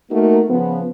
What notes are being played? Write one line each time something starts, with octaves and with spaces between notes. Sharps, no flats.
A3 A#3 D#4 F#4 A#4
C#3 F3 B3